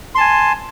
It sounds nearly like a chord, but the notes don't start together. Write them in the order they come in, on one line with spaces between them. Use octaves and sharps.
C6 A5 G#5